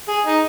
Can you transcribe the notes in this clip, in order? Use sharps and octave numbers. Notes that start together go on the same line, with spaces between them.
G#4
D#4